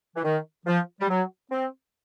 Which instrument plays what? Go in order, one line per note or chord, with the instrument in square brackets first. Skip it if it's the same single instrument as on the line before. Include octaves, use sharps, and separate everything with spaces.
[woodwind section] E3
D#3
F3
G3
F#3
C4